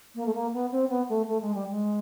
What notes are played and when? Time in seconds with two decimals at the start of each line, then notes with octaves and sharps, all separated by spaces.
0.15 A#3
0.26 A3
0.34 A#3
0.53 B3
0.71 C4
0.89 B3
1.09 A3
1.27 A3
1.41 G#3
1.54 G3
1.69 G#3